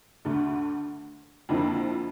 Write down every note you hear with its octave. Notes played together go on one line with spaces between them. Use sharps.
D2 D3 A3
F2 D3 F3 A#3 E4